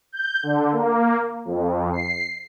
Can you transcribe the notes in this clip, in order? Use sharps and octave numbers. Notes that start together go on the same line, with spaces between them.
G6
D3
A#3
F2
C7